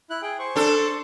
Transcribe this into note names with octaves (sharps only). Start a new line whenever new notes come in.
E4 F#6
G#4 G5
C5 C#6
D4 A4